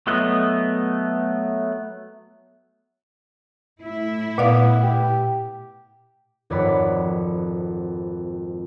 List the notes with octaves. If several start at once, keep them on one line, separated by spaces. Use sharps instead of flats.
F#3 A3 B3 D#5 F#6
A2 E4
A#2 B3 D5 F5
G4
G#1 F2 C#5 D5 F#5 B5